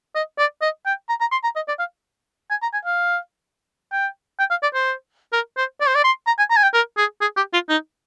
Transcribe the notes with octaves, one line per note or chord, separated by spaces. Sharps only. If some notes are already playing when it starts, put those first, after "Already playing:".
D#5
D5
D#5
G5
A#5
A#5
C6
A#5
D#5
D5
F5
G#5
A#5
G#5
F5
G5
G5
F5
D5
C5
A#4
C5
D5
C5
D5
C6
A#5
G#5
A#5
G#5
G5
A#4
G#4
G#4
G4
F4
D#4